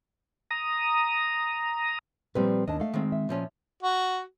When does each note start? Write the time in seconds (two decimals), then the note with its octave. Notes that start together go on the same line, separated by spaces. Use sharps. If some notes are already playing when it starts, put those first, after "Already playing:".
0.51 A#5 D#6
2.35 A#2 F3 G3 C4 B4
2.68 D#2 D4 D#5 A5
2.80 A3 F5
2.94 D#3 G#3 C4
3.12 E5
3.29 A#2 F3 C#4
3.83 F#4